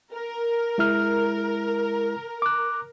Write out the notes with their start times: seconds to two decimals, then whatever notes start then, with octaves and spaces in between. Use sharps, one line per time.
0.14 A#4
0.78 G#3 E4 F6
2.42 D6 F#6